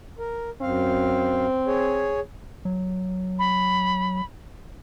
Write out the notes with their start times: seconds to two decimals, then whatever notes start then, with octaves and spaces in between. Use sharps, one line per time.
0.19 A#4
0.62 F#2 C4 F5
1.67 G#4 C#5
2.65 F#3
3.39 B5